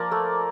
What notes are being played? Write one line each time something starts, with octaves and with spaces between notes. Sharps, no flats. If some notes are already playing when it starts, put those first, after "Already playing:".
Already playing: F3 A#3 A#4 D5
A3